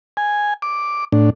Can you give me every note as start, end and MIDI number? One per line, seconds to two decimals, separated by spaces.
0.17 0.54 80
0.62 1.05 86
1.12 1.30 45
1.12 1.30 62